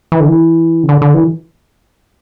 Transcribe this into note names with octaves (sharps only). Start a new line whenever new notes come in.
E3
D3
E3
C#3
D3
D3
E3